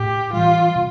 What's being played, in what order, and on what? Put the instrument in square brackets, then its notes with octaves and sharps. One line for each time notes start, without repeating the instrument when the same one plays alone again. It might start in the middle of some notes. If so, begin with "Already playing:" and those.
Already playing: [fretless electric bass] A2 [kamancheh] G4
[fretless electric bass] E3 G3 [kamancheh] F4
[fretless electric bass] C3